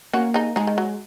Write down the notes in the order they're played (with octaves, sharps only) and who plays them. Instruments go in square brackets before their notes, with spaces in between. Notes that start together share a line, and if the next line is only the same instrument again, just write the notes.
[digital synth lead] A#3 [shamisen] C#4 F#4
[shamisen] D#4 G#4
[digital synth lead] G#3 [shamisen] D#4 G#4
[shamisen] D#3
F#3